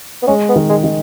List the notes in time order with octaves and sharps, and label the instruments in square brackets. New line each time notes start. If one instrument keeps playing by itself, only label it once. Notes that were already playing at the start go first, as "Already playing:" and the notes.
[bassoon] B3
[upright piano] G#3 [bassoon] C#4
[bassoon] B3
[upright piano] D#3
[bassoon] G#3
[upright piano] D#3